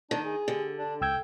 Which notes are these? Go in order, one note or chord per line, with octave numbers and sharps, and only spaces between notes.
D#3 D4
G#4
D3 G4
D4
C#2 G5 E6 G#6